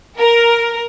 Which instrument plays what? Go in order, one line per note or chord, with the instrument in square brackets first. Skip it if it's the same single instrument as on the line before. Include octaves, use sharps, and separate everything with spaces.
[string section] A#4